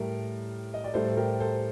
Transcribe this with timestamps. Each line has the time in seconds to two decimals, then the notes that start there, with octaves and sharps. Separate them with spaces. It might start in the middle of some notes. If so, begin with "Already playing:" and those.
Already playing: A2 G3 A#4
0.74 D#5
0.84 D5
0.94 A2 G3 A4 C5
1.08 A4
1.17 G4 A#4
1.40 A4 C5